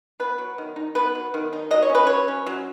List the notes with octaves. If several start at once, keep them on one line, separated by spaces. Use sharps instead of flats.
B3 B4
F#3
D#3
D#4
B3 B4
F#3
D#3
D#4
F#3 D#5
C#5
C#4
B4
F#3 C#5
C#4
F#3